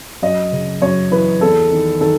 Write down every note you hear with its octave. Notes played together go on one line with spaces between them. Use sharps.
F#2 D#5
C#3
F#2 C#5
E3 B4
E2 A4
D#3
D#3 A4